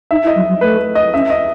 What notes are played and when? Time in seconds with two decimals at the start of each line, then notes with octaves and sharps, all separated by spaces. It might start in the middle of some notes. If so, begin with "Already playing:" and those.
0.11 D#4 E5
0.24 E4
0.27 D#5
0.36 F#3
0.49 F#3
0.61 A3 B4
0.95 D#5
1.14 C#4 E5
1.30 D#5